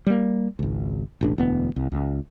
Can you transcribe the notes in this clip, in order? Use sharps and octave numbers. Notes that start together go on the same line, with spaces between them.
G3 A#3
G#1 C#2
E1 A1 D4
E1 D2 B3
C2
C#2